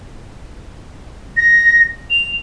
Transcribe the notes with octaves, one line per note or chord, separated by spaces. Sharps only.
A#6
F7